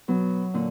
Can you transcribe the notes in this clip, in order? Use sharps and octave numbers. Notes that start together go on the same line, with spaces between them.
B2 F#3 B3
A#2 D3 A#3